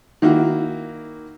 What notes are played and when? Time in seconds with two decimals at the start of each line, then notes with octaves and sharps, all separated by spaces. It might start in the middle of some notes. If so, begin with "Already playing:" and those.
0.22 D#3 A#3 E4 F#4